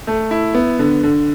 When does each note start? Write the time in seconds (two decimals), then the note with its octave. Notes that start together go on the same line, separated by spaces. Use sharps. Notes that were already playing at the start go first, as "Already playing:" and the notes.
0.07 A3
0.31 E4
0.55 B3
0.79 D3
1.03 D3